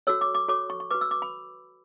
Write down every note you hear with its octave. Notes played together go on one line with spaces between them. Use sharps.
F#4 A4 C#5 E6
D6
D6
F#4 A4 C#5 D6
C#6
C#6
F#4 B4 D6
E6
D6
B5